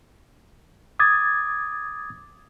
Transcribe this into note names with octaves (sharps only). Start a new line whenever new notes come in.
D6 D#6 G#6 A6